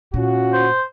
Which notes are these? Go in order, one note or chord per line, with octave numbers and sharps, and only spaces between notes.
A#2 C#4 F4 F#4
C5